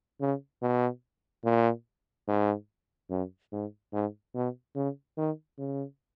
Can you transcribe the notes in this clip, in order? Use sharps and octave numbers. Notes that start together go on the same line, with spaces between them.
C#3
B2
A#2
G#2
F#2
G#2
G#2
B2
C#3
D#3
C#3